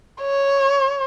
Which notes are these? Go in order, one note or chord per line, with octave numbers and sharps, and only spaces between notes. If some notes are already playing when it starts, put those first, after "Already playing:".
C#5